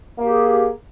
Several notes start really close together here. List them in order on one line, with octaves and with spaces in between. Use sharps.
A#3 G4 G#4